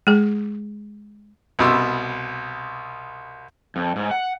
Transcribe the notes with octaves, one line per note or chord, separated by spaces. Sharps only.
G#3 G#4
C2 B2 C6 E6
F2
G#2
F#5